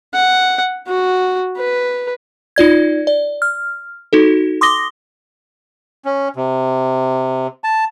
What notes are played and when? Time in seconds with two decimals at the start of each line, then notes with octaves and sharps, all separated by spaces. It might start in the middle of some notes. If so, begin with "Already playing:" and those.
0.14 F#5
0.87 F#4
1.57 B4
2.56 D#4 F4 D5 G#6
3.07 D5
3.42 F6
4.13 D#4 F#4 A4
4.61 C6 D6 D#6 A#6 G7
6.05 C#4
6.36 C3
7.64 A5